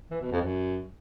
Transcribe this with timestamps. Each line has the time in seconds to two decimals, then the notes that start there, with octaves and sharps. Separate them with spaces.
0.11 E3
0.21 B2
0.31 F2
0.42 F#2